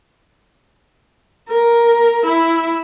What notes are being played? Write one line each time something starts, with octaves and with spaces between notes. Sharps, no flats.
A#4
E4